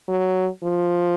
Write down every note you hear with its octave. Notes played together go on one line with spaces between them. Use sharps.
F#3
F3